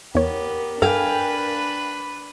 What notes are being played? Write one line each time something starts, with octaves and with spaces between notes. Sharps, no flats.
E2 B3 G4 A#4 C#5
G2 D4 A4 B4 F5 G5 G#5